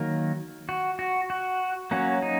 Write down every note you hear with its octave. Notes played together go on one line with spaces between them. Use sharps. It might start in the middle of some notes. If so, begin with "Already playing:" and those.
Already playing: D#3 F#3 A#3 A#4
F#4
F#4
F#4
F#3 A#3 C#4 F#4
D#4